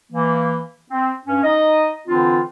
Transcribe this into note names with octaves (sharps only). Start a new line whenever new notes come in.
E3 A#3
C4
G2 C#4
D#4 D#5
D3 E3 C4 D4 F4